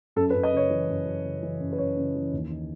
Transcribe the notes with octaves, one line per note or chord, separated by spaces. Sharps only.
F#2 A4
B4
F#2
D#5
C#3 C#5
E3
F#2
F#2
C#3
E3
F#2
B4
F#2 C#5
C#3
E3
D#2
D#4